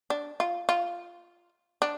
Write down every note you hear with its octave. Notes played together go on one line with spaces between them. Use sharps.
D4
F4
F4
D4